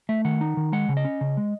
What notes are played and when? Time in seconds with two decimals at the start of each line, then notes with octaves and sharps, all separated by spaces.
0.09 A3 E5
0.25 D#3 F#5
0.41 D#4
0.57 D#3
0.72 G#3 F#5
0.89 C#3
0.97 D#5
1.05 C#4
1.21 C#3
1.37 G#3